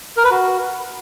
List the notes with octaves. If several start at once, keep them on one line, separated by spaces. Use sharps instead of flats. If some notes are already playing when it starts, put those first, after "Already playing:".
A#4
B4
F#4